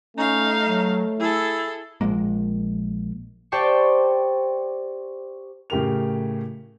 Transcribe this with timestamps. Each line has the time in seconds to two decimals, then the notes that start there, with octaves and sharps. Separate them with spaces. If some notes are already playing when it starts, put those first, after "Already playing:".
0.17 A3 C#4 D#4 F5
0.65 F#3
1.19 E4 G#4 A4
2.01 A#1 F3 G#3 A#3
3.52 G4 C5 D5 G5 A5 C#6
5.70 A2 C#3 G4 A#4 F7